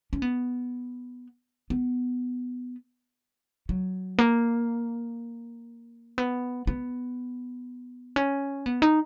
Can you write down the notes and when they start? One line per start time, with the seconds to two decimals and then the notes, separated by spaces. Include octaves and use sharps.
0.13 C#4
0.22 B3
1.70 B3
3.69 F#3
4.18 A#3
6.18 B3
6.67 B3
8.16 C#4
8.66 B3
8.82 D#4